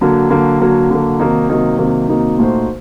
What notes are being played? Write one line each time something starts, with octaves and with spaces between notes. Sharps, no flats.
D3 F#3 A#3
D3 F#3 A#3
D3 F#3 A#3
D3 F#3 A#3
C3 D#3 F#3 A#3 D#4
C3 D#3 F#3 A#3 D#4
C3 D#3 F#3 A#3 D#4
C3 D#3 F#3 A#3 D#4
A#2 A3 D#4 F#4 C5